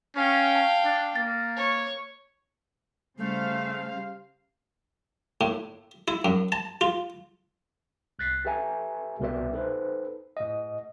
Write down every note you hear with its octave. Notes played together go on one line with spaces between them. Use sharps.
C#4 F5 G5
A5
D4
A#3 A6
C#5
C#3 G3 A3 C5 F5
A2
E4
F#2
A5
F4
C2 F#6 A6 B6 C7
G4 A4 B4 E5 G#5 A#5
C2 B2 A#4 B4 D5 E5
D#4 A4 B4 C5
A2 D#5